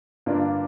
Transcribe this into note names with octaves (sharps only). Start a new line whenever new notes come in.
G2 D3 A#3 D4 F4